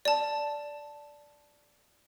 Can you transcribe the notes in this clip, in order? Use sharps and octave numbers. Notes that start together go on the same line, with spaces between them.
D5 A5